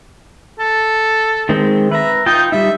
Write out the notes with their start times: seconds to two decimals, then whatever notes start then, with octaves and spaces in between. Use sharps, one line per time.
0.59 A4
1.49 D#3 G#3 C4
1.92 B4 E5 A#5
2.26 D#4 F4 G5
2.52 G3 D#4 E5